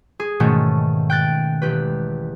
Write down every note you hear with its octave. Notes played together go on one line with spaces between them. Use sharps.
G#4
G#2 B2 D#3 A3 C#4
G5 F#6 A6
E1 G4 B4